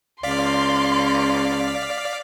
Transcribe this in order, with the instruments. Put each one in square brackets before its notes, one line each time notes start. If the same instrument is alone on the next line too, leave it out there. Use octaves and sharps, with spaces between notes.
[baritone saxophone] C#2 [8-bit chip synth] D5 F5 B6 [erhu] C6